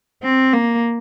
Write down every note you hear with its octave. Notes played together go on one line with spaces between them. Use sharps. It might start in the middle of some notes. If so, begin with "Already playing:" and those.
C4
A#3